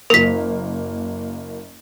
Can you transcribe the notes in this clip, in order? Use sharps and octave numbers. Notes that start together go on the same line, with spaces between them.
F#1 A#3 A#4 B6